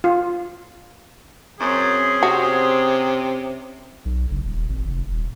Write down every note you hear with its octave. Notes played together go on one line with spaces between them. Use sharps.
F4
F#2 C4 C#4 G#4
C3 F#4
B1
F#1
D#1
G#1
F1
D#1